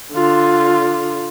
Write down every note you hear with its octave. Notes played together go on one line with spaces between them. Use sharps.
D3 F4